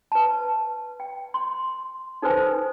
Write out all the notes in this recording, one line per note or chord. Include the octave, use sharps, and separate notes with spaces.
B4 A5
G5
C6
D#4 A4 B4 C5 G#5